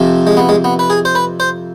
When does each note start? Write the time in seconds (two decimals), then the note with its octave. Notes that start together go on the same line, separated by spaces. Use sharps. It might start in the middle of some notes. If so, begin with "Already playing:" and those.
Already playing: F2 C3 F3
0.27 G#3
0.37 B3
0.49 G#3
0.64 B3
0.79 B4
0.90 G#4
1.05 C5
1.15 B4
1.40 C5